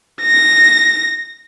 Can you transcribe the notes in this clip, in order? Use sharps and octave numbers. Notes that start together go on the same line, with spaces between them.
A#6